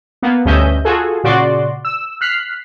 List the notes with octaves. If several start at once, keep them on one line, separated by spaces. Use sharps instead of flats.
A#3 B3
D2 G2 C#4 D#5 E5 G6
F4 F#4 G#4 A4
A#2 C#3 F#4 D5 C6
E6
F6 F#6 B6 C7